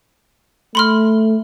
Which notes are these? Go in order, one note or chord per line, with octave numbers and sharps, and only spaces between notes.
A3 B5 C6 F6